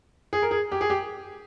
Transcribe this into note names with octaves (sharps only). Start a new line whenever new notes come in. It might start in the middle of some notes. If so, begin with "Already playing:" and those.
G#4
A#4
G#4
G4
G#4
G4